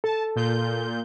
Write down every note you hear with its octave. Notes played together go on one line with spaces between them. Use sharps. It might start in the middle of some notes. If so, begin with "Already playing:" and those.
A4 A5
A#2 F4 G6